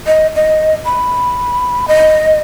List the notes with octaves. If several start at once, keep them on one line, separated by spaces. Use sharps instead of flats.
D#5
D#5
B5
D#5